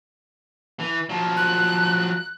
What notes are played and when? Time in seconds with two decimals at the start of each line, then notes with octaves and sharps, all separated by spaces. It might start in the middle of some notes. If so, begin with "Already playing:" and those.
0.80 E3
1.09 F3 F#3
1.37 F#6